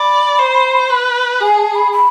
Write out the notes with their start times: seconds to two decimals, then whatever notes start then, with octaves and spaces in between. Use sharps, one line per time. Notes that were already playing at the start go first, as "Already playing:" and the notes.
Already playing: D5 B5
0.39 C5
0.90 B4
1.41 G#4 G#5
1.58 A5
1.75 B5
1.92 B5